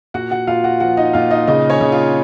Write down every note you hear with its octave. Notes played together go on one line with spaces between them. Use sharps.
A#2 F#4 F#5
F#4 F#5
A#2 F4 F5
F#4 F#5
F3 F#4 F#5
D#4 D#5
A#2 F4 F5
D#4 D#5
C#3 D#4 D#5
C#4 C#5
C#3
F4